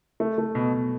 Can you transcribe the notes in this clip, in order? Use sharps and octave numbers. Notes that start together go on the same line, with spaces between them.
A3
A3
B2
B2